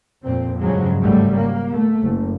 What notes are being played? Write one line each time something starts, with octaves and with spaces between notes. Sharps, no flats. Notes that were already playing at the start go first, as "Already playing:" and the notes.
F2 A#2 C4
G2 C#3 F3 F#3 G#3
G#1 C#3 F#3 G3 A3
A#3
A3
F#1